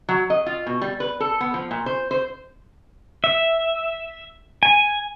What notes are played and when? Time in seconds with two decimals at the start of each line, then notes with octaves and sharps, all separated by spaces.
0.09 F#3
0.30 D#5
0.46 F4
0.67 B2
0.82 G3
1.00 B4
1.20 A4
1.41 B3
1.54 F3
1.71 A#2
1.86 C5
2.11 C5
3.24 E5
4.63 G#5